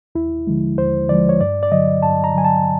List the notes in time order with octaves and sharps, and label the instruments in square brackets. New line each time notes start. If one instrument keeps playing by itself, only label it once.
[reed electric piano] D#2 E4
D3 F3 G#3
D#2 C5
D3 F3 G#3 D5
C#5
G2 D5
D5
D3 F#3 D#5
G2 A5
A#5
D3 F#3 G#5
A5